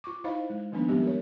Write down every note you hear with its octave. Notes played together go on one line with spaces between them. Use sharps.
F4 C#6 D6
D#4 E4 C5 D#5 F5 B5
G#3
D#3 F3 A#3 B3 D4 D#4
F3 G3 G#3 B3 C4 G4
A#4 C#5